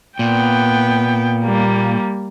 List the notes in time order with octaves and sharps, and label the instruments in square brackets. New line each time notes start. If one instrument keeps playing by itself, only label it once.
[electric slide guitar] A#2 [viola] B3 G5
[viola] G3 A#3